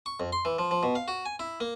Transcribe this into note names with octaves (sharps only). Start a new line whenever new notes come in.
C#6
F2
C6
E3
F3
F3
B2
F5
F#4
G#5
E4
A#3